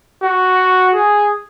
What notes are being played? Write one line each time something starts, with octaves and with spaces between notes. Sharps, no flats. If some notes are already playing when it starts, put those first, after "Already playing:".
F#4
G#4